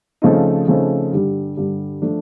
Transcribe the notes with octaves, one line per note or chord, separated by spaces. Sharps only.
C#3 F3 A3 C4 D#4
C#3 F3 A3 C4 D#4
G2 D3 G3
G2 D3 G3
F3 A3 D4